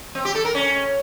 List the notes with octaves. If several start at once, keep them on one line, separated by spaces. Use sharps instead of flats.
C4
G4
A4
A#4
C#4